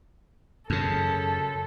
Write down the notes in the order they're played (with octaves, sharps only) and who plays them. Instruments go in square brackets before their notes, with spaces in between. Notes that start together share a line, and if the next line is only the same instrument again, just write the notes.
[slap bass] F#2 C#3 [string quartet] A4